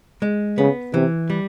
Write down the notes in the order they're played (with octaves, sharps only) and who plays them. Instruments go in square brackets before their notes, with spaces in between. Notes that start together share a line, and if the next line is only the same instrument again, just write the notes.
[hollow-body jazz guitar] G#3
[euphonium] C#3 [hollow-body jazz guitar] B3
[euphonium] C3 [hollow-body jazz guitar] E3
[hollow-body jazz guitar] G3